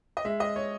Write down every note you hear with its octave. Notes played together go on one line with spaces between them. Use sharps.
D#5
G#3 E5
D#5
C#5